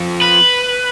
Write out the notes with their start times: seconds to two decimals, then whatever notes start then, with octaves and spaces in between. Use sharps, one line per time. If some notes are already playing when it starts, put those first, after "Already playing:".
Already playing: F2
0.22 B4